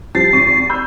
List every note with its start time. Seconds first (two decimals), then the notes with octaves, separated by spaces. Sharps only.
0.15 F3 G3 A6 C7
0.33 G#1 C#6 D#7
0.69 B5 E6 G6